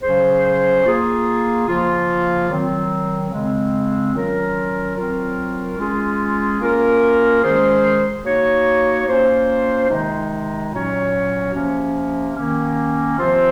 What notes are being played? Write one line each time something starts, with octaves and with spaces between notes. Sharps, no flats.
C#3 F#3 C#4 G#4 C5
A#3 F4 G#4
C#3 F3 A#3 F4
D#3 F#3 C4
C#3 G#3 C4
D#3 F#3 C#4 F4 A#4
F#3 C4 F4 A#4
G#3 C#4 F4 G#4
A#3 C#4 F4 A#4
D#3 G#3 C#4 G#4 C5
A#3 D#4 F#4 C#5
A#3 C#4 F4 C5
C3 D#3 G#3 D#4
A#2 F#3 C#4 F#4 C#5
C3 F3 A#3 C#4
D#3 A#3 C#4
C3 F3 C4 F4 C5